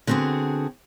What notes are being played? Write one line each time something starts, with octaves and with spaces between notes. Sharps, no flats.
D3 B3 C4 F#4 G#4